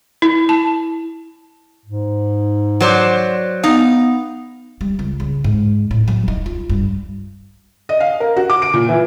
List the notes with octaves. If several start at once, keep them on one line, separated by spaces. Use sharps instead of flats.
E4
A5
G#2
F#3 C5 D5
B3 D#4 F5
G3
C#2
C#3
G#2
A2
F#3
D#4
F4
G2
D#5
F5
A#4
F#4
D6
D7
A#2
E3